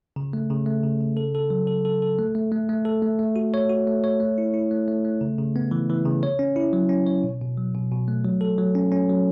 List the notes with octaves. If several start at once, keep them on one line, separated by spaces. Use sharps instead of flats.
C#3
A3
C#3
A3
C#3
C#3
A4
A4
F#3
A4
A4
A4
A3
A3
A3
A3
A4
A3
A3
F#4
C#5
F#4
A3
C#5
A3
E4
E4
A3
A3
A3
C#3
C#3
B3
E3
E3
C#3
C#5
C#4
E4
F#3
C#4
C#5
B2
B2
F#3
B2
B2
A3
F#3
A4
F#3
C#4
C#4
F#3